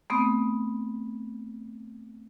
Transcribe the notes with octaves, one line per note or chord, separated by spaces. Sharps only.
A3 B3 C4 D#6